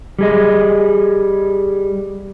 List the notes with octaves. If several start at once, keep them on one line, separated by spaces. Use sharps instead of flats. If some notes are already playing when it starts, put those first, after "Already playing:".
G3 G#4 D#5